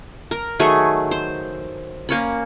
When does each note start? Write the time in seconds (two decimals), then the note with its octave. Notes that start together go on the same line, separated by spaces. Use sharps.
0.31 A#4
0.59 D#3 F#3 A3 G#4
1.11 C5
2.09 A#3 C#4 B5